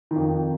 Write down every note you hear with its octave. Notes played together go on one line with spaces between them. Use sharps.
D#3
F2